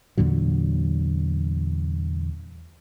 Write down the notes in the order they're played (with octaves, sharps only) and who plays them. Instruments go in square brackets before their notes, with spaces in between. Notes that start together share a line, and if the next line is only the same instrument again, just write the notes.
[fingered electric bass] E2 A#2 D3 F#3